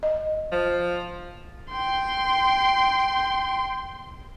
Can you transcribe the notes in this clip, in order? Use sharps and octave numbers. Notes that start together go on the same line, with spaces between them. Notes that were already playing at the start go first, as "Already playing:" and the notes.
D#5
F3
G5 C6